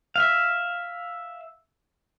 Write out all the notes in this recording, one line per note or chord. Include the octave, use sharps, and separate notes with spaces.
E5 F5